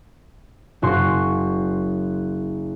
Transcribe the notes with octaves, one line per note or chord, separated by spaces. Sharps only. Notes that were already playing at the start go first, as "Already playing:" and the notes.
F#1 F#4 C6